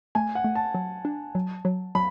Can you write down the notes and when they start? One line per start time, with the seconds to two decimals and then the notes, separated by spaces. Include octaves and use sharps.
0.15 A3 G#5
0.35 F#5
0.44 A3
0.55 A5
0.74 F#3
1.05 D4
1.35 F#3
1.65 F#3
1.95 F#3 B5